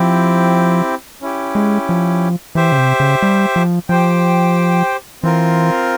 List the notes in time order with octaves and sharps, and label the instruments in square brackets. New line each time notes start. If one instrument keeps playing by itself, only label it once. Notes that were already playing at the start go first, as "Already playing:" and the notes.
Already playing: [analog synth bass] F3 [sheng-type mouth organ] C4 E4 G4
[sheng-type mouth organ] C#4 E4 G4
[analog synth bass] G#3
F3
[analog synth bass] E3 [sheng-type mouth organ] G4 C5 E5
[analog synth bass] C#3
C3
C#3
G3
F3
[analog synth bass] F3 [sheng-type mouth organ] G4 C5 G5
[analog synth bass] E3 [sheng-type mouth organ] C4 F4 A#4